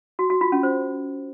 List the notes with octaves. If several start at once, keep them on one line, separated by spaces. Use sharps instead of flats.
F#4
F#4
F4
C#4
C5